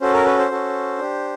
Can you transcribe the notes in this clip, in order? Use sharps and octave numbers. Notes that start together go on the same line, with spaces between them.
C#4 F#4 A4 C5
A#4
B4
C5
C#4 F#4 A4
D4 G4